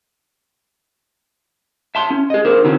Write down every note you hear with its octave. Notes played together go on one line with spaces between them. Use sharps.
E5 A5 C6
C#4
G#4 D#5
D4 A#4 C5
D3 D#3 C4 C#4 F#4